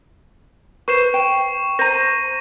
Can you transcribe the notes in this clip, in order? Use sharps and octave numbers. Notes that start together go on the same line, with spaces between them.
B4 C5 C#6 C7 E7
G5
C5 A#5 A#6 D#7